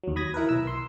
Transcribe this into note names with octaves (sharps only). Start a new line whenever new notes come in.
D#2 F#3
B5 D#6 G#6 A#6
E3 E4 A#4 B4
B1 E6
C6